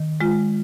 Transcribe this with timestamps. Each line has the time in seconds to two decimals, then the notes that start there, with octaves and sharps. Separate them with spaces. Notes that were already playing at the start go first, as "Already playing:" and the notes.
Already playing: D#3
0.21 G#3 F4